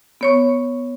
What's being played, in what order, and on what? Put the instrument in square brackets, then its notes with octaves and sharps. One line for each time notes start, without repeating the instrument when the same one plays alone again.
[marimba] B3 C#5 C#6